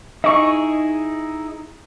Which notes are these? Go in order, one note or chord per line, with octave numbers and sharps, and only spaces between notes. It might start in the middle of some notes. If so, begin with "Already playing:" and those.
D#4 E4 G#4 D#5 C#6